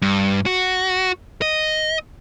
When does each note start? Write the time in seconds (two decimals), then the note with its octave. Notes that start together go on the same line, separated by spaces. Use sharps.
0.02 G2
0.46 F#4
1.42 D#5